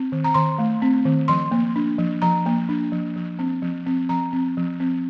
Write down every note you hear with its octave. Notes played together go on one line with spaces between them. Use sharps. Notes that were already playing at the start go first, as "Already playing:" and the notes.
Already playing: C4
D#3
A#5
D#3 C6
A3
C4
D#3
F3 C6
A#3
D4
F3
F3 A#5
A#3
D4
F3
F3
C4
F3
C4
F3 A#5
C4
F3
C4